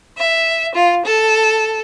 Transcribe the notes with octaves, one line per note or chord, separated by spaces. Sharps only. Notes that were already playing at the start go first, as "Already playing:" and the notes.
E5
F4
A4